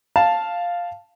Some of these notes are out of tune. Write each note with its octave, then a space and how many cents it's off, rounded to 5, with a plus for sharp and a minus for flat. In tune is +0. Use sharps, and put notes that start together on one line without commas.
F5 +0 A5 +0